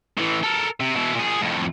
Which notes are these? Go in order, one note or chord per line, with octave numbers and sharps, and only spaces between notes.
A2 E3
A4 A#4
C3
B2 E4
A#2 G#4
F2 A2